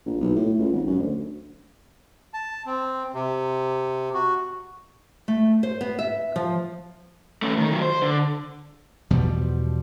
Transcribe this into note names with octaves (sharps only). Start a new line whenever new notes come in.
A#1
B1
A2
C#2
G#1
F#2
D2
A5
C4
C3
F#4
A3
C5
B3
E5
F3
A3 C#4
D#3
D#3 F#3
C5
D3
E2 B2 F3 G3